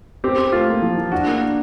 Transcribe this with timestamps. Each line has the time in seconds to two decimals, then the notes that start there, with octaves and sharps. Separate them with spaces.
0.24 C4 G4
0.38 C4
0.52 A3 F4
0.68 A#3
0.82 F3
0.98 F3
1.12 D4 F#4
1.27 A#3
1.42 D4